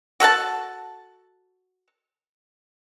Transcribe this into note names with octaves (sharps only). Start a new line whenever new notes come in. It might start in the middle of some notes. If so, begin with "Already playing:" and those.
F#4 A4 F#5 A5